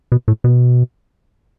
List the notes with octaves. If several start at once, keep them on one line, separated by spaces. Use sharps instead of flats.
B2
A2
B2